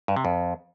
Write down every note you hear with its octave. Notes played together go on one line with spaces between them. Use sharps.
G2
C3
F2